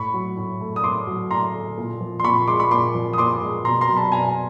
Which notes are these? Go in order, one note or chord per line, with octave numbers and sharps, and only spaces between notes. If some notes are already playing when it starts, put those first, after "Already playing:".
Already playing: A2 B5 C#6
F#3
A2
A3
D#6
A2 C6 D6
F#3
A2 A#5 C6
A3
A#2
F3
C6
A#2 B5 C#6
G#3 C6 D6
B5 C#6
A#2 C6 D6
F3
D#6
A#2 C6 D6
G#3
B2 A#5 C6
A#5 C6
F#3
A5 B5
B2 G#5 A#5